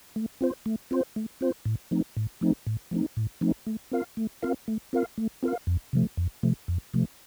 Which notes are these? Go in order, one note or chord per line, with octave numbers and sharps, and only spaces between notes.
A3
C4 F4 C5
A3
C4 F4 C5
A3
C4 F4 C5
A2
F3 A3 C4 D#4
A2
F3 A3 C4 D#4
A2
F3 A3 C4 D#4
A2
F3 A3 C4 D#4
A3
C4 F4 A#4 F5
A3
C4 F4 A#4 F5
A3
C4 F4 A#4 F5
A3
C4 F4 A#4 F5
F2
C3 F3 A3
F2
C3 F3 A3
F2
C3 F3 A3